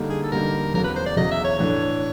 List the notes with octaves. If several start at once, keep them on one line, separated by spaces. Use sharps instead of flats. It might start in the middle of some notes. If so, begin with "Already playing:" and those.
Already playing: D3 G3 A#3 D#4
G#4
A4
D3 G3 A#3 D#4 A#4
E2 C#3 F#3 A#4
B4
C5
D5
E2 C#3 F#3 D#5
E5
C#5
A2 E3 A3 D4 C#5